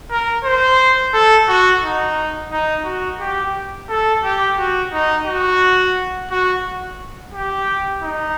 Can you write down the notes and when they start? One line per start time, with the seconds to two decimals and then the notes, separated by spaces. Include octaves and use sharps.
0.10 A#4
0.45 C5
1.14 A4
1.48 F#4
1.83 D#4
2.52 D#4
2.85 F#4
3.20 G4
3.89 A4
4.24 G4
4.58 F#4
4.93 D#4
5.26 F#4
6.31 F#4
7.34 G4
8.03 D#4